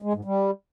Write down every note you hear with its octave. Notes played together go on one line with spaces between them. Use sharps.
G#3
G#2
G3